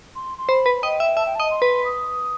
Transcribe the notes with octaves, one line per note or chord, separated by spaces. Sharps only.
C6
C6
C5 B5
B4
D#5 G5
E5
E5 A5
G5
D#5 A5
C6
B4
D#6